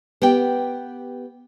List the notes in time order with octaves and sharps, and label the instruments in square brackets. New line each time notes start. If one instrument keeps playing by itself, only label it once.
[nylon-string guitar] B3 G4 G5